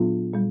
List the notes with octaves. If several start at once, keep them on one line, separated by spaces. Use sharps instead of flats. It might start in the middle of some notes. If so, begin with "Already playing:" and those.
Already playing: A#2 F#3 B3 D4 F4
A#2 G3